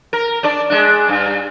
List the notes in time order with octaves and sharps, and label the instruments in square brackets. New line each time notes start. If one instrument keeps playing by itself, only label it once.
[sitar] A#4
D4 D5
G#3 D4
G2